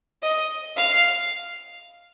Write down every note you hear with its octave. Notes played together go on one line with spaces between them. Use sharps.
D#5
F5